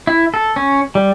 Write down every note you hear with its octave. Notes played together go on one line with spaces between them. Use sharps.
E4
A4
C#4
G3